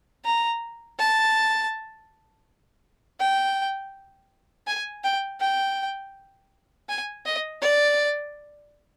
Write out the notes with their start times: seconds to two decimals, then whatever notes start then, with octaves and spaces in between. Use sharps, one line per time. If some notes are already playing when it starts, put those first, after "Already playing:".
0.25 A#5
0.99 A5
3.20 G5
4.67 G#5
5.04 G5
5.40 G5
6.89 G#5
7.26 D#5
7.62 D5